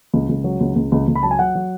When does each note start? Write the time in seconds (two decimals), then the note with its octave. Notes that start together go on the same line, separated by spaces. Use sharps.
0.14 C#2
0.29 C#2
0.44 F#3
0.60 C#2
0.76 C#2
0.92 C#2
1.08 C#2
1.15 B5
1.23 F#3 A5
1.31 G#5
1.39 F#3 F#5
1.55 F#3